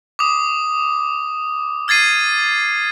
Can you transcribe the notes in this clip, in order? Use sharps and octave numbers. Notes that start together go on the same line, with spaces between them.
D6 D#6
F6 G#6 A6 C7 D#7